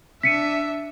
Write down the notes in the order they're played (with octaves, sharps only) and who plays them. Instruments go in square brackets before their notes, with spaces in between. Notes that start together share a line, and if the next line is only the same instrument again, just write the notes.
[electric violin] D4 E5 [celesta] B6 C#7 D#7